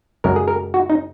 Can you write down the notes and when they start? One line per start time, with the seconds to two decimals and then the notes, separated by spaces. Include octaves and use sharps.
0.24 F#2 C#3 G#3 A#4
0.36 G#4
0.48 A#4
0.74 F#4
0.90 D#4